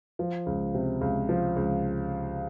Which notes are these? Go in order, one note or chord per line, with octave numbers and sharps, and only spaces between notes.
F3
C#2
C3
C#2
F3
C#2